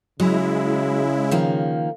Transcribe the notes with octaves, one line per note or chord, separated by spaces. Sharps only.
C#3 F#3 G#3 E4
D#3 F3 A#3